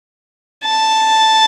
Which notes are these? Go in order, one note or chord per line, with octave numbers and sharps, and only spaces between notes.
A5